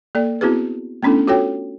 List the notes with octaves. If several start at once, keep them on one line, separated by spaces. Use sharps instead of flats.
A#3 A4 D5
B3 C4 E4 F#4 G#4 B4
A3 B3 C#4 D4 E4 A4
F4 F#4 A4 C#5 G5